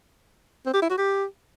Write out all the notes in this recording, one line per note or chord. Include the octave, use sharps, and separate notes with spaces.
C4
G4
E4
F#4
G4